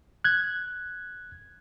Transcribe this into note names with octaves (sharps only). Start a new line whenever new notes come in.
F#6 G#6